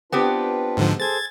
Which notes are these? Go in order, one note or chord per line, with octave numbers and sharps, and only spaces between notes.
B3 C4 D4 F4 G4 B4
G#2 D3 F3
G#4 A4 C5 G#6 A6